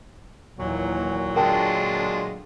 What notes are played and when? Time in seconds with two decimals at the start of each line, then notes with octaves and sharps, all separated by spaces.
0.59 D#2 A#2 E3 F#3
1.36 D3 G#3 D4 F4 A#4 G5 A5